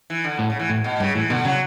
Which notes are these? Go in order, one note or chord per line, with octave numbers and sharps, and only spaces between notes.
E3
D3
A2
C#3
E3
A2
B2
G2 C#3
A2 E3
B2 D3
C#3 F#3